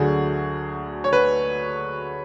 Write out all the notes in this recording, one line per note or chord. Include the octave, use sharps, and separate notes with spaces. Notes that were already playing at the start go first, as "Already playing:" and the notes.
Already playing: D2 D3 F#3 G#4
C#5
B4